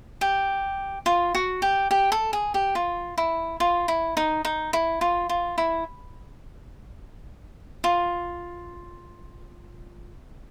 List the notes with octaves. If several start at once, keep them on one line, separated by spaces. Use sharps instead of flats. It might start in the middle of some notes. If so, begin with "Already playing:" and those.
G4
F4
F#4
G4
G4
A4
G#4
G4
F4
E4
F4
E4
D#4
D#4
E4
F4
F4
E4
F4